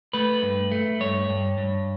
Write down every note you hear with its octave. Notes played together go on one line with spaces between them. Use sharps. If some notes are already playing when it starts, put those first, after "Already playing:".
A3 B4
G2
A3
G2 C#5
G2
G2